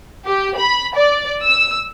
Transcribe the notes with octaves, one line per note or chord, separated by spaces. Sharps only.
G4
B5
D5
E6